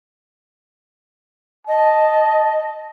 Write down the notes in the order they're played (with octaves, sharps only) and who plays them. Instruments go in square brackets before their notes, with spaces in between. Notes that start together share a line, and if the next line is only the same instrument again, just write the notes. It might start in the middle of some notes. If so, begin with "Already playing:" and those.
[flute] D#5 [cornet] A5